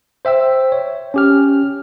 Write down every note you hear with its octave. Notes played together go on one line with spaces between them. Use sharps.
C5 E5 G5 E6
C#5
C#4 G4 F6